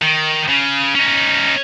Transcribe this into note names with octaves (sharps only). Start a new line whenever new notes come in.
D#3
C#3
C#4 D#4